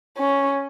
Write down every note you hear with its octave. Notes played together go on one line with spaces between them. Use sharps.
C#4